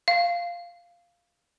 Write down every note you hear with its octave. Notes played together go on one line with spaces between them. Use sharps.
F5